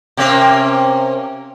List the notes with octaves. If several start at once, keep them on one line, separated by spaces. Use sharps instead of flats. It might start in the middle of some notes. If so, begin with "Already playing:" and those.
C3 A#3 C#4